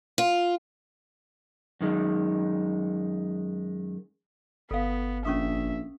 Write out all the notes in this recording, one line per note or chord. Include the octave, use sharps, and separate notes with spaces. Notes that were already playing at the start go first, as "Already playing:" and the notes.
F4
F#2 D#3 G#3
G1 B3 A4 F5
A#1 C#4 E5 C#6 D#6